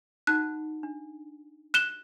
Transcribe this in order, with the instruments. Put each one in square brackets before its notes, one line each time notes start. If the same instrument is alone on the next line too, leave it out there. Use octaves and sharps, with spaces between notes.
[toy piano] D#4 F#4 F#5 [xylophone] F#6
[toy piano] D4
[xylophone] F#6 E7 G7